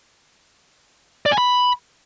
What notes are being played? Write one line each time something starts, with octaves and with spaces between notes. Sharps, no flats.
D5
G#5
B5